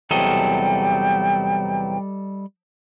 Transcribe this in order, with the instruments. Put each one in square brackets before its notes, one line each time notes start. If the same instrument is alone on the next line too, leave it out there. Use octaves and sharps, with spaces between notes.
[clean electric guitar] E2 C3 F#3 [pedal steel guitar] G3 A4 D#5 [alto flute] G5